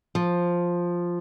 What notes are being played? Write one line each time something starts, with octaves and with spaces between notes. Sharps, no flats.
F3